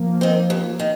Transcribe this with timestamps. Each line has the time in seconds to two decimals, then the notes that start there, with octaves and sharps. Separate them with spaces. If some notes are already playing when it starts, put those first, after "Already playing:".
Already playing: F3 A#3
0.21 D#3 C4
0.50 D#2
0.79 D#3